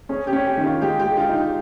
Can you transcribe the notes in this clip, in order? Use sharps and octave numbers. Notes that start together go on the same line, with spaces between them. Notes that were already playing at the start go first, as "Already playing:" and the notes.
C#4 G#4
G4
C#4
G4
D#3
F4
G#3 G4
G4
G#3
F4
D#4
G4